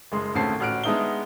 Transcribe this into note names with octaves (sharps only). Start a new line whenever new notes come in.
F#1 G#3 C6
G#1 D2 C#3 C4 A5 C7
A1 F#4 F6 F#6 D7
G#3 B3 D4 D#4 E5 G7